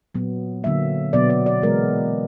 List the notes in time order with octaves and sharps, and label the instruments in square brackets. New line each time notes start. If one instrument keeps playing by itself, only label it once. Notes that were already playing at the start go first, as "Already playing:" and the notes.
[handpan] A#2 F#3 B3
D3 F#3 A#3 E5
B2 F#3 B3 D5
D5
D5
E3 G#3 B3 A#4